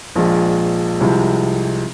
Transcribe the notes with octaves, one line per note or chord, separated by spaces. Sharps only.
A#1 A#2 F3 G#3
C2 C3 F3 G#3